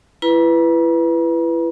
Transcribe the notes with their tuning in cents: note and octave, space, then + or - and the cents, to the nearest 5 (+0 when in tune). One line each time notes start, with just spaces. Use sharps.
E4 +30 B4 +0 A#5 +45